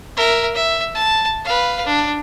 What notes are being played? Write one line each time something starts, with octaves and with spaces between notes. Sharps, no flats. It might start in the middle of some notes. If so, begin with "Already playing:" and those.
A#4 E5
E5
A5
B4 F5
D4